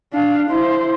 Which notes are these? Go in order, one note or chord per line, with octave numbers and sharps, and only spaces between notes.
D4 F5
E4 C5